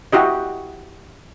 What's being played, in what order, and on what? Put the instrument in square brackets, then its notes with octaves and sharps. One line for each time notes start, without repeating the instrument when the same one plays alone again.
[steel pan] E4 F#4 G4 D#5